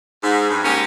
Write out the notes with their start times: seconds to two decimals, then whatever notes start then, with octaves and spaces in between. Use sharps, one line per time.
0.24 G#2
0.50 G2
0.64 G#2 G#3 A#3 C#4 G4